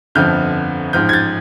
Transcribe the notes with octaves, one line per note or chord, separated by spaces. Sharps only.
G1 F2 D3 F3 F6 G6
A1 G#2 F3 F6 G6
G#6
G6 A6